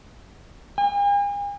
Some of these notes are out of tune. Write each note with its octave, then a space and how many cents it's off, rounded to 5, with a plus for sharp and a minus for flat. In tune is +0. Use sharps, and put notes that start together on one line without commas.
G#5 -45